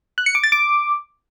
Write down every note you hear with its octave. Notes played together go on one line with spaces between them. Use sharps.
F#6
C#7
D6
A6
D6